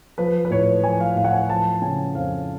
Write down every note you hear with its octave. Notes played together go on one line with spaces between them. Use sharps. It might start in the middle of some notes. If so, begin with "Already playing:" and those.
F3 B4
B4
A2 C#5
F3 G#5
F5
A2 F5
F#5
G#5
F3 A5
C#3 G#5
F2 F5